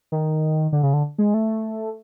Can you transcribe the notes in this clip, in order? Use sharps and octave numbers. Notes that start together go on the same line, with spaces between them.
D#3
D3
C#3
D3
G#3
A3